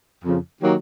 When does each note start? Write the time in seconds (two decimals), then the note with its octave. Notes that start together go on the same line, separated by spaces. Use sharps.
0.24 F2 C#3 F3
0.61 D#3 F#3 A#3 D#4 G4